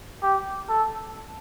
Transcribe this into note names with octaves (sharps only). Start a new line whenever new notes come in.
G4
A4